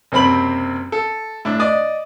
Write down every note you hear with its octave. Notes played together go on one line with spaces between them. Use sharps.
F#1 C3 C4 B5 F#7
A4
A2 D4
D5 D#5 D#6